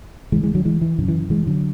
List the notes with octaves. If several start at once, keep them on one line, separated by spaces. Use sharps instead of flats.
D2 C#3 E3 G#3
E3 G#3
D3 F#3
E3 G#3
E3
F#2 C#3 D3
E3
E3 G#3
D3 F#3